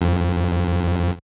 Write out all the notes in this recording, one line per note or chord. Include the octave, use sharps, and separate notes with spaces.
F2